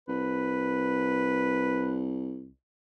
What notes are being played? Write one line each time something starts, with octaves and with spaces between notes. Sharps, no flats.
C2 B4